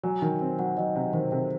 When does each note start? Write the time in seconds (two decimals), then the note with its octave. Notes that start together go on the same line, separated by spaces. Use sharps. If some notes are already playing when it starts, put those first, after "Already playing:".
0.03 F#3 G#5
0.22 D#3
0.41 C4
0.59 F#3 F#5
0.77 F#3 D#5
0.95 C3 D#5
1.13 D#3 C5
1.32 C3 A4